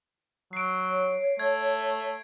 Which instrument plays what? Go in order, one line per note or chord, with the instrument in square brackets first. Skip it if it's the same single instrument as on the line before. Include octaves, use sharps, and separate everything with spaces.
[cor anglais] F#3 [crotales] C7 D7
[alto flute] C#5
[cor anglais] A3 [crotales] G#6